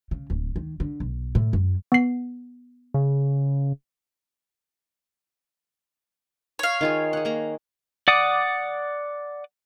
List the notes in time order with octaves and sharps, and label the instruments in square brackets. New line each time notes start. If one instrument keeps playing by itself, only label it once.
[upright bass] C#3
D1
D#3
D3
B1
A2
F#2
[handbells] B3 C7
[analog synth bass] C#3
[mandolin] C#5 F5
[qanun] D#3 F4 G#4
G#4 F#5
A#3 G#4 A#5
[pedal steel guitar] D5 F#5 D6 D#6